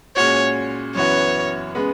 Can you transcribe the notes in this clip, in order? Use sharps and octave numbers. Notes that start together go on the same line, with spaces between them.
A#2 G#3 C#4 F#4 C#5
F#2 E3 B3 F#4 C#5
C#3 G#3 B3